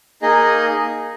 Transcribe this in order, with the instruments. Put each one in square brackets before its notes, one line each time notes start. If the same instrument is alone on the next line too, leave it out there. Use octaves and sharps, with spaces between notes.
[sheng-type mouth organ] A#3 D#4 G#4 D#5